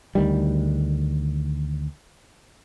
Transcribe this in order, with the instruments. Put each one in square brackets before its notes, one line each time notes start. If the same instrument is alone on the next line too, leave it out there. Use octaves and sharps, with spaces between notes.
[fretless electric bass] D2 D#3 G3